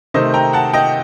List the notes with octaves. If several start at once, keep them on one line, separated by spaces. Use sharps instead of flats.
C3 D#3 A3 C5 D#5
G5 A#5
F#5 A5
D#5 G5